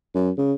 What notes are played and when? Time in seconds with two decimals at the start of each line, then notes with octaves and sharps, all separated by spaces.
0.15 F#2
0.38 C#3